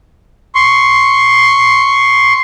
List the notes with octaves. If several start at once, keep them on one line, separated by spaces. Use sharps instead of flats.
C6 C#6